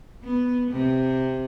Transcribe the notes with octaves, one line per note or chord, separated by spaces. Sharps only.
B3
C3